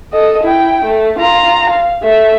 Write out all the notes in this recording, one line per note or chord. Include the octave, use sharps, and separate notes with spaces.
A4 D#5
E4 G5
A3
F4 A#5
F5
A3 E5